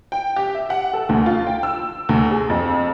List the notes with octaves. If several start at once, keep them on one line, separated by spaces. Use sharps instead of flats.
G5
G4
E5
F#5
A4
D2
F4
G5
E6
D2
G#4
F2